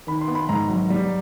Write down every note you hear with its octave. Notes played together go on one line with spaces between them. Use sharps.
D#3 B5
C6
B3
B5
G#2 A#5
F#3
G3